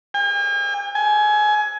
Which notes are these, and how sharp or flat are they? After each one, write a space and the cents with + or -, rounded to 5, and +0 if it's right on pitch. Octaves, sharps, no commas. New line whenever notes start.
G#5 -45
G#5 +25